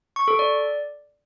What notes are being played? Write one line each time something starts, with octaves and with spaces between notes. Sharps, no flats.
C#6
A4
D5